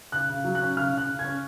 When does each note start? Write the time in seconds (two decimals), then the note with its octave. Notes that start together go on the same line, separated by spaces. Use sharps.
0.12 C#3 F#6
0.29 C#3
0.44 F#3
0.55 F#6
0.61 C#4
0.76 C#3 F6
0.93 C#3
0.98 F#6
1.09 C#3
1.19 G#6
1.24 C#4